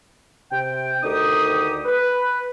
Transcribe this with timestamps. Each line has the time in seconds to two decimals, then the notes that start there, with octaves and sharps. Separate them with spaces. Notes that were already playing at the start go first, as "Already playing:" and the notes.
0.52 C3 G5
1.03 D2 D3 D#3 D#4 G4 D#6
1.86 B4